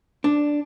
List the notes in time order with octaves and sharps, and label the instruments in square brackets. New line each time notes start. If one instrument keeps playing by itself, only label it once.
[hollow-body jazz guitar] D4